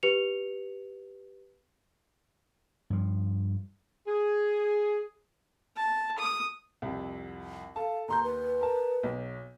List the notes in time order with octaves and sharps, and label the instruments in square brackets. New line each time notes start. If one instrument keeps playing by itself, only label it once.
[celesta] G4 B4 C#7 F7
[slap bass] G2 F3
[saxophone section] G#4
[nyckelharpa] A5
D#6
[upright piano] C2 F2
[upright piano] A4 A5 [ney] F5
[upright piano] D#2 C6 G6 [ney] A#5
[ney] B4
[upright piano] A#4 A5
B1